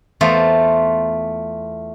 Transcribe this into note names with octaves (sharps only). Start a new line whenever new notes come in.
E2 A3 F4 C5